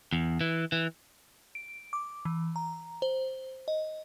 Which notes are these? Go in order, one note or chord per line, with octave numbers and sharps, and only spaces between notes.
E2
E3
E3
D7
D6
E3
A#5
C5
D#5